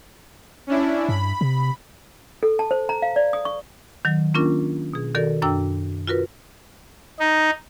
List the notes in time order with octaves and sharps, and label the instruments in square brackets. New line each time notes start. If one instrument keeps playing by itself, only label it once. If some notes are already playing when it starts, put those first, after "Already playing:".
[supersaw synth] C#4 D4 E4
[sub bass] G2 [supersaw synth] B5
[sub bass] C3
[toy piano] A4
A5
C5
A#5
F5
D5
D#6
C#6
[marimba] D#3 F#3
A#3 C#4 D4 F4 A#4
B2 G#4
D#3 F#4 A4 A#4 D5
F#2 D4 F#4 G5 E6
F4 F#4 A#4 B4
[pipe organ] D#4